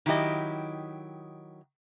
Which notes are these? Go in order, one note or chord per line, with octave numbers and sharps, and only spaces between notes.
D#3 F#3 E4 G4 D#5